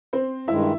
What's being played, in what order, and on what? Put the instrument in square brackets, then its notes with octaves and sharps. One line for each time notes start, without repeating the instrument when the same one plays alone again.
[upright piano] C4 C5
[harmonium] G2 D#3 G#3 [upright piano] E4 E5